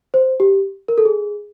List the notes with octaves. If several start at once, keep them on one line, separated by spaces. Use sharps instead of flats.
C5
G4
A#4
A4
G#4